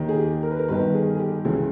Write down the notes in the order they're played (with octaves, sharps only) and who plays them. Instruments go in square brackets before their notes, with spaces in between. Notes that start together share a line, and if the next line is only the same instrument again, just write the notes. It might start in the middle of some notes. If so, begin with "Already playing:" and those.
Already playing: [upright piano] D#2 D#3
G#4
G4
A#4
B4
A#4
G1 G2 D#3 B4
G#4
G#4
G4
C#2 C#3 E3 E4